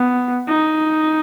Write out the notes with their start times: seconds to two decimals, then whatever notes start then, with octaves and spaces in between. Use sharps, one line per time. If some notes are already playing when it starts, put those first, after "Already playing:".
Already playing: B3
0.48 D#4